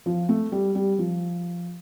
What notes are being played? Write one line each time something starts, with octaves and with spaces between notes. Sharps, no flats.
F3
A3
G3
G3
F3